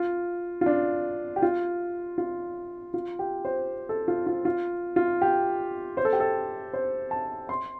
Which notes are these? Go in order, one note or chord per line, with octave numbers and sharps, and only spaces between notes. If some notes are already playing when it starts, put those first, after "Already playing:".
Already playing: F4
F4
D4
G4
F4
F4
F4
G4
C5
A4
F4
F4
F4
F4
G4
C5
A4
G4
A4
C5
A5
C6